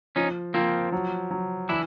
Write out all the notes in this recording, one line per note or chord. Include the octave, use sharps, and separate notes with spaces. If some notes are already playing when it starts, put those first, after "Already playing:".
F3 C#4 D#4
F3 A#3 C4
F#3
F#3
E3 D4 E4